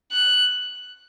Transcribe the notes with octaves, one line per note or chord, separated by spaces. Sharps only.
F#6